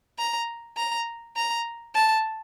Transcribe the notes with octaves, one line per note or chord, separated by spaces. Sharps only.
A#5
A#5
A#5
A5